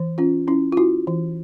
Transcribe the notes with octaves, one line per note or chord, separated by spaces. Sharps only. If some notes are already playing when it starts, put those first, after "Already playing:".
Already playing: E3
C#4 F4
C#4 E4
F4
E4 F#4
E3